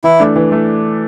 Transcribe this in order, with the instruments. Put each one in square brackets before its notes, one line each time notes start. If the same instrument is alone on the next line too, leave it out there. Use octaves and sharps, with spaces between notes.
[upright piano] E3 [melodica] E4
[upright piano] A3 D4
E3
A3